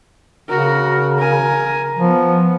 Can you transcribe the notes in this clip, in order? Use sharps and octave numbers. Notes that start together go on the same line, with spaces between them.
C#3 F#4 A#4
A#4 G#5
F3 B3